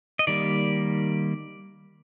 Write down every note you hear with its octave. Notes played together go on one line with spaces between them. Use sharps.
D#5
D#3 G3 A#3 D5